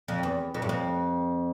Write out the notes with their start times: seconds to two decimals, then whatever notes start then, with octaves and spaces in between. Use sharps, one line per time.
0.08 F2
0.23 E2
0.54 F2
0.62 G2
0.69 F2